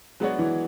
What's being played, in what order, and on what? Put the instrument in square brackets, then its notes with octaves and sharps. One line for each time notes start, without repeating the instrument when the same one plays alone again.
[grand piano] F#3 B3 D4 F#4 C#5 [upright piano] G#3
[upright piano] E3